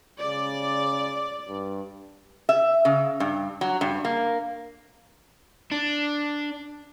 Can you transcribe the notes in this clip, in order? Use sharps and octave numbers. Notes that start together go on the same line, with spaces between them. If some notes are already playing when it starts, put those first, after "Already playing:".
C#3 D5
G2
E5
C#3
G2
F#3
G2
A#3
D4